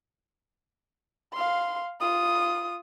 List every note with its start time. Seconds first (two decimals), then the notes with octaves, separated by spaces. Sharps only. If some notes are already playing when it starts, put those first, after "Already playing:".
1.34 F5 C6
2.01 F4 D#6